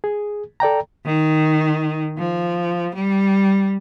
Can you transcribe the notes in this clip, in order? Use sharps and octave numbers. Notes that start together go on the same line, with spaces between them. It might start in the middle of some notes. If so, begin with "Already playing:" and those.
G#4
A4 D5 G5 A#5
D#3
F3
G3